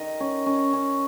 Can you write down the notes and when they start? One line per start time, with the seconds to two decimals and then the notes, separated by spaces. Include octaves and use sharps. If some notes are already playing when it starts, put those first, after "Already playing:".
Already playing: D#3 D#5
0.20 C#4
0.46 C#4
0.73 C#4